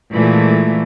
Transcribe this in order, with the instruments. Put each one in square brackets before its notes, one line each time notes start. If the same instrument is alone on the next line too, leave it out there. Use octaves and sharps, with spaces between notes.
[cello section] A#2 E3 G#3 A3